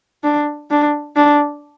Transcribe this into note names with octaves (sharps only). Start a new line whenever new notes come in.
D4
D4
D4